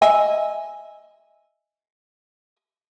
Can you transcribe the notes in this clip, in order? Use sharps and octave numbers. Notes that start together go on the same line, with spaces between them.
D#5 E5 G#5